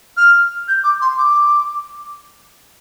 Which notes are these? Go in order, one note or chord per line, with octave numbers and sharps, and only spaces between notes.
F6
G6
D6
C6
D6